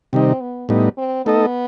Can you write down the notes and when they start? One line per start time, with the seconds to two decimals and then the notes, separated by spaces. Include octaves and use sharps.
0.13 C3 D#3 G3 C4 D#4
0.41 B3
0.69 A2 G3 B3 D#4
0.98 C4
1.26 A3 B3 D#4 A4 D#5